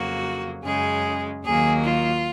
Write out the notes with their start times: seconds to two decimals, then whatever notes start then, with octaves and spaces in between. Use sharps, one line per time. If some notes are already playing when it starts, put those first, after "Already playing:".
Already playing: F2 C#3 F#3 A#3 F#4
0.64 F#2 C#3 G#3 G#4
1.44 D#2 D#3 F#3 A#3 G#4
1.83 F4